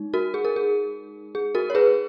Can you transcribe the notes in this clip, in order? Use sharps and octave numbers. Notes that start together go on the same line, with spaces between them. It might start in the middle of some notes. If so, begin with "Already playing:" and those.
Already playing: G#3 D#4
F#4 A#4
G#4
A#4
G#4
G#4
F#4 A#4
C#5
G#4 B4